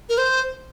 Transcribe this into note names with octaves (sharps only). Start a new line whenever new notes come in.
A#4
C5